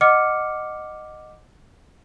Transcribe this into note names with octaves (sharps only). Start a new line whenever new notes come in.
D#5 F#5 D6 F6 C#7